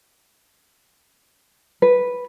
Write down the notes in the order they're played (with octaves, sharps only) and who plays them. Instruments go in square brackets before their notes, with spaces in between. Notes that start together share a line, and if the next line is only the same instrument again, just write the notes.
[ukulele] B4